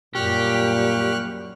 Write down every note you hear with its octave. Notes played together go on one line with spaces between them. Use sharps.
F#2 A#2 G3 G4 C#6 F6 F#6